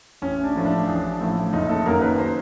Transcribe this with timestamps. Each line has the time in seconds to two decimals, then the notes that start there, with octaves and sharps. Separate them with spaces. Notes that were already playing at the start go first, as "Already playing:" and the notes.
0.22 A1 C#4
0.44 D4
0.55 A2 F3 A3
0.65 D4
0.87 A1
1.21 A2 F3 A3
1.53 F#1 D#4
1.69 A4
1.86 F#2 D#3 F#3 A#3 A#4
2.02 B4
2.18 C5